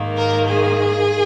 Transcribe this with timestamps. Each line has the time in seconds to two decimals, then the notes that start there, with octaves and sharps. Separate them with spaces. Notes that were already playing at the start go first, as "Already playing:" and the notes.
Already playing: G#2 D#3 A#3
0.17 A#4
0.47 G#4